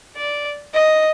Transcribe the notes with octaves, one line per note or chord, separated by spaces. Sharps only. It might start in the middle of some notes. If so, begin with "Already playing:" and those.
D5
D#5